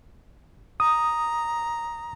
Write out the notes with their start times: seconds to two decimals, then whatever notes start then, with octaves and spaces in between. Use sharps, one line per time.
0.80 A#5 D#6